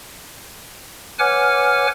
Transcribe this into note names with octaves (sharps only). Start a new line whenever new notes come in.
B4 C#5 F#5 G#5 D6 F6